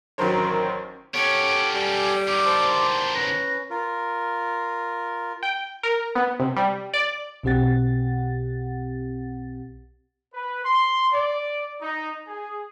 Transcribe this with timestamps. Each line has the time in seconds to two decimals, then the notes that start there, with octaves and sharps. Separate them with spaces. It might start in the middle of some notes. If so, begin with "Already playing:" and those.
0.18 A1 D#3 F#3 A#4 C5 C#5
1.14 B3 C#4 G4 A4 C#5 F6 D7
1.74 G3 G#5
2.28 E2 D#3 D6
2.45 C5 A5 C6
3.15 C#4 B4 A#6
3.70 F4 A#4
5.43 G5
5.83 A#4
6.15 B3
6.40 C3
6.56 G3
6.94 D5
7.43 B1 B2 C4 G4 F#5 A6
10.34 B4
10.65 C6
11.13 D5
11.82 D#4
12.27 G#4